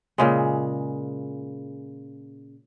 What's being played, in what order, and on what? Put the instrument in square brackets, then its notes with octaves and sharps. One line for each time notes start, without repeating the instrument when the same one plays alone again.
[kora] A#2 C#3 G#3